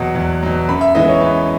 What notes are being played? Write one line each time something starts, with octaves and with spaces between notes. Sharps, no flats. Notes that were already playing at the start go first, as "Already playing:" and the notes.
Already playing: E2 B2 F#3 F#5
E2
B2 F#3
F#2 B5
E5
E3 G#3 B3 D#5
C#5
F#2 B4